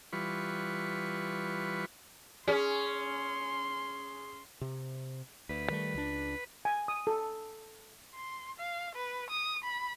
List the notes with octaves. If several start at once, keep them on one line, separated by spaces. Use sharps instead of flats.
E3 G3 F4 B4 C#6
C#4 G#4 C6
C3
D2 B4
D#3 G3 A3
C#2 D4
G#5
D#6
A4
C6
F5
B4
D#6
B5